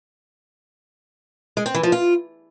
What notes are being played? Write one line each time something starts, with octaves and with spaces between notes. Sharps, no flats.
G#3
C4
E3
F3
F4